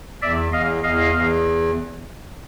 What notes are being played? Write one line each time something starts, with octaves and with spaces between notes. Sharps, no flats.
E2 D5 E5
E2 D#5 F5
E2 D#5 F5
E2